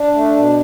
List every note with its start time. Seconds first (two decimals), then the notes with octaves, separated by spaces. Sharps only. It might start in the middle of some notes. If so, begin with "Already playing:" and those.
Already playing: D4
0.14 A3
0.36 B2